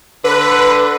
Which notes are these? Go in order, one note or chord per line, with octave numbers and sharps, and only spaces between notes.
D3 B4